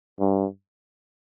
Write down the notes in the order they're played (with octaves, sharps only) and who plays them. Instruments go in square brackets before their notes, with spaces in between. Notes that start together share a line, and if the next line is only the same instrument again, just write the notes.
[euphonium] G2